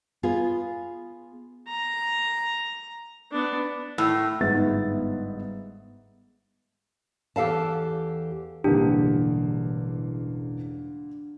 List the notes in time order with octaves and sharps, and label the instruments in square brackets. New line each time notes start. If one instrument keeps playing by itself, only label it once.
[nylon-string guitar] B3 F4 G#4
[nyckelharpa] A#5
B3 D4
[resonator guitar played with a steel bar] A2
[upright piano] G1 G#2 B3 E5 A6
[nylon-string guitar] E2 G4 A4 F5 A5
[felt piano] E1 A1 E2 [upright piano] D3 G3 A#3 [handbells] D4 [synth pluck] G4